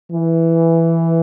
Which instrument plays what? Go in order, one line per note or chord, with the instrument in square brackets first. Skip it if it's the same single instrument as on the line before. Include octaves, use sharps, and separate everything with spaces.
[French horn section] E3